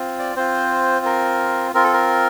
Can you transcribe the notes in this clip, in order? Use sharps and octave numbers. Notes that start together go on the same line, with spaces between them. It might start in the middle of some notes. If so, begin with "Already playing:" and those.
Already playing: C4 F4
D5
C4 F4 C5
A#4
C4 F4 A#4
A4
A#4